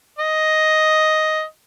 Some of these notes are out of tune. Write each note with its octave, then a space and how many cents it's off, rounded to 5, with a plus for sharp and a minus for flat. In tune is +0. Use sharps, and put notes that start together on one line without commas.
D#5 +5